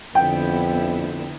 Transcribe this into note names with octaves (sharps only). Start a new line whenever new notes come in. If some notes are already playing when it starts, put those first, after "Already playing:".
F2 D3 B3 E4 G5